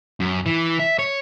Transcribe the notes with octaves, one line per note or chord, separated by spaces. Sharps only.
F#2
E3
E5
C#5